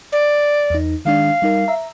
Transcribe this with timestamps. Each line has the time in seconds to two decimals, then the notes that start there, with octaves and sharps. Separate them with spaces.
0.12 D5
0.70 E2 D#4
1.05 D#3 G#3 D4 F5
1.42 G3 D#4 A#4
1.68 E5 A#5